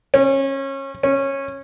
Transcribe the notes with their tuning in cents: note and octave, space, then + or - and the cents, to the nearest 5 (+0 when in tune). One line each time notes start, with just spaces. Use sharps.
C#4 -25
C#4 -15